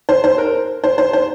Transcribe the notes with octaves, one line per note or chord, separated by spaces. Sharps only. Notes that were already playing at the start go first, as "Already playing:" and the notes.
C5
C5
A#4
C5
C5
C5